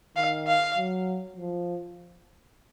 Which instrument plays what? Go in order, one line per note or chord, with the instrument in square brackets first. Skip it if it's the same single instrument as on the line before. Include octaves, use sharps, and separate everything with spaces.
[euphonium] D#3 [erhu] F5
[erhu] F5
[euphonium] F#3
F3